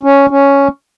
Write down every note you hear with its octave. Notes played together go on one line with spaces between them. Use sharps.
C#4
C#4